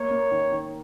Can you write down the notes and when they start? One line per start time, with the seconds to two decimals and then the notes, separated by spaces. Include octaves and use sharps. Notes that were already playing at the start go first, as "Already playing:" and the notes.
Already playing: A#3 C#5
0.10 A#3
0.31 D#3
0.51 D#3